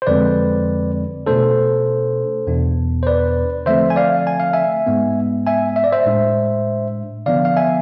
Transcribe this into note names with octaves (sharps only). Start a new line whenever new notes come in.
C5
F2 D3 F3 G#3 C4 B4 D5
B2 A3 D4 A4 C5
E2 B2 B3 D4
C5
B4 D5
D3 F3 A3 C4 C5 E5
G#5
D5 F5
G#5
F5
E5 G#5
G#2 G#3 B3
E5 G#5
E5
D5
C5 E5
A2 G#3 D4
D3 F3 B3 D4 D5 F5
F5
E5 G#5